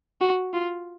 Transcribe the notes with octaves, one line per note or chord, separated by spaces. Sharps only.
F#4
F4